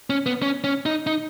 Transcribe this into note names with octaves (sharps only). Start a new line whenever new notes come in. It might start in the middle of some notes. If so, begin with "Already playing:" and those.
C#4
B3
C#4
C#4
D#4
D#4